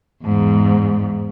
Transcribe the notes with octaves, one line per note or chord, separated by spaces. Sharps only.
E2 G#2